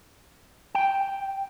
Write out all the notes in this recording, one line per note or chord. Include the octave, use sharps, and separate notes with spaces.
G5